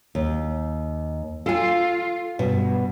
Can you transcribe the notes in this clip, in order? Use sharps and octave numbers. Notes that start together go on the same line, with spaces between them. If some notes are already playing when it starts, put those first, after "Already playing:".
D#2
F4 A4 G#5
G2 B2